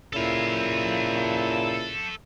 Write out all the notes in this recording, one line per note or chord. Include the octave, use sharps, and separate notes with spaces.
A#2 C#3 E4 A4 F5